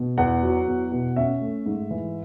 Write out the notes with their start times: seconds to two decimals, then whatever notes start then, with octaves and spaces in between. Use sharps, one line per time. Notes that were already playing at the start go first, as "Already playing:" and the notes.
Already playing: B2
0.18 E2 F#5
0.43 F#3
0.68 E2
0.92 B2
1.16 C#4 E5
1.41 A3
1.66 G#2
1.91 E3